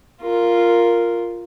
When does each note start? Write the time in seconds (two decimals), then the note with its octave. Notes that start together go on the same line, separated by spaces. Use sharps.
0.21 F4 A#4